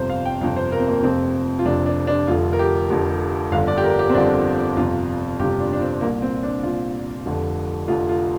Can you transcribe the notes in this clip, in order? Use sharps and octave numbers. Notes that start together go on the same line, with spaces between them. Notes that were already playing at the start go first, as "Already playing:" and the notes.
Already playing: G1 F2 C3 C5
F5
G5
G1 F2 C3 F5
C5
A#4
C4
A#3
F1 F2 C3 C4
F4
F1 F2 C3 D4
D4
D4
F1 F2 D3 F4
A#4
G4
F1 F2 D3
G1 F2 D3 F5
D5
G4
A#4
G4
C4
G1 F2 D3 D4
G1 F2 C3 F4
G1 F2 C3 G4
D4
D4
C4
C2 A#2 A#3
C4
D4
C2 A#2 F4
F1 F2 D3
F1 F2 D3 F4
F4